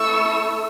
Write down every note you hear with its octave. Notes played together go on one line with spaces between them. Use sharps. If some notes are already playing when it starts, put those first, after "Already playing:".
Already playing: A3 E4 A4 C#6 E6